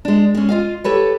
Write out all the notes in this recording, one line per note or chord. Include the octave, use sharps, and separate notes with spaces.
G#3 D4
G#3 C#4
F4 D#5 F5
G4 A4 B4 C#5